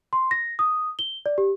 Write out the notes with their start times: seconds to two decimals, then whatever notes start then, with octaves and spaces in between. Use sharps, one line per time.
0.13 C6
0.31 A#6
0.59 D#6
0.99 G7
1.26 D5
1.38 G4